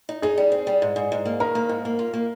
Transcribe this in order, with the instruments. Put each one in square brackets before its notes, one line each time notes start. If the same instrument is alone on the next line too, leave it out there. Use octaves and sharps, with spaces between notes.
[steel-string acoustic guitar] D#4
[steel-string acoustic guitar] D#4 [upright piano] G#4
[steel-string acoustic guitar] G3
C4
G3
G#2
G#2
G#2
A#3
[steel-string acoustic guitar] D#3 [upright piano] A#4
[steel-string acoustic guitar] A#3
G#2
A#3
F4
A#3